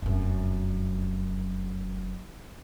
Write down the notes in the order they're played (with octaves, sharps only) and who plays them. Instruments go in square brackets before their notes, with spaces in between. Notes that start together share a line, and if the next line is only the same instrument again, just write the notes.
[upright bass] F1 F#2